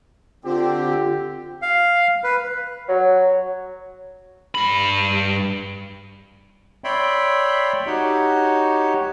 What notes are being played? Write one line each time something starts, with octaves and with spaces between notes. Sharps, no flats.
D3 C4 F4 G4
F5
B4
F#3
G2 B5
C#5 D5 E5 G5 B5 C6
D#4 F#4 G4 C#5